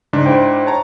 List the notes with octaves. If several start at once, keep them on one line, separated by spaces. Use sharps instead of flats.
G#2 C#3 D4
E4 C5 G5
C#5 A5 A#5